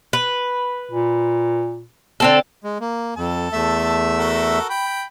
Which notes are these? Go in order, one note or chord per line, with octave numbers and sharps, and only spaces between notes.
B4
A#2
D3 C4 A4
G#3
A#3
F2 A4 A5
E2 A3 E5
F#4 A4 A#4
G5 B5